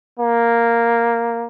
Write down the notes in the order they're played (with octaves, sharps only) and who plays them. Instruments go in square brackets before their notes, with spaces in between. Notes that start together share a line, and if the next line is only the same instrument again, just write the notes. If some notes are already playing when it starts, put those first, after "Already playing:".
[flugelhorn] A#3